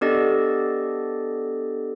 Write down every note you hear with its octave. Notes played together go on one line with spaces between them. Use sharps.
B3 D4 G4 A4 D5 D#5